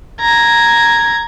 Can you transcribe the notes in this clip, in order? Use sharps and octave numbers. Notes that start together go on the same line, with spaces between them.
A#5 G#6